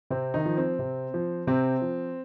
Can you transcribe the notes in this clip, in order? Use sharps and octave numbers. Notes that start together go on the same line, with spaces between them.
C3 C4
D#3 D#4
F3
C4
C3
F3
C3 C4
F3